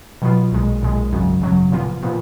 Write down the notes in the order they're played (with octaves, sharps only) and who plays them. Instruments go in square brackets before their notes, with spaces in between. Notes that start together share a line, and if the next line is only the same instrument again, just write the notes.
[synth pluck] B2 F#3 B3 F4
B1 A#2 G#3
B1 A#2 G#3
G#1 F#2 C#3 F#3
G#1 F#2 C#3 F#3
A#2 F3 B3 F4
A#2 F3 B3 F4